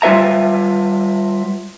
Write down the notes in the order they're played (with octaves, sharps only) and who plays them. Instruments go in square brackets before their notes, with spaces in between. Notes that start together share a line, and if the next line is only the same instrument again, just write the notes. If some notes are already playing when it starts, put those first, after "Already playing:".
[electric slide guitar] G3 F4 B4 E5 A#5